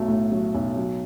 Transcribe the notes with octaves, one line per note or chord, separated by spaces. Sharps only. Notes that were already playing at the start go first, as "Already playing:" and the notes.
Already playing: B1 F#3 A3
A2
F#3
B1
F#3